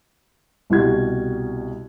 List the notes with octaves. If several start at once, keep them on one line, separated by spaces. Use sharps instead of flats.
C2 B2 G3 F#4 G#6